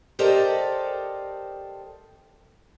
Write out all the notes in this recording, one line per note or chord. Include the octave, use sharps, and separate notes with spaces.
G4 A4 A#4 C5 D5 D#5